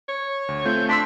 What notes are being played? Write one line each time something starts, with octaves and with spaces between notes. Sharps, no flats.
C#5
D2
A3 C4 F4 G6
D4 A5 C6 E6 B6